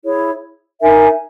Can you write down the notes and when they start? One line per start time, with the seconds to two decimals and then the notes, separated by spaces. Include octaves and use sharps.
0.03 E4 G#4 C#5
0.80 D#4 A#4 E5 G#5